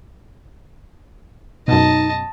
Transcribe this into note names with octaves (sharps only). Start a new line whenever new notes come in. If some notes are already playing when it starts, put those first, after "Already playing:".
F#2 B2 D#4 D#5 A5